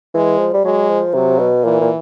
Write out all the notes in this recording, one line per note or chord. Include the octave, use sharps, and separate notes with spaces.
E3 G#3
F3
G3
F#3 G#3
F3
C3 F#3
B2
A#2 E3
A#2